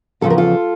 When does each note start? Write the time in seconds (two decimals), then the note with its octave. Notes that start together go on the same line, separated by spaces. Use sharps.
0.21 E2 C#3 F3 A4
0.30 A#4
0.38 F4 A4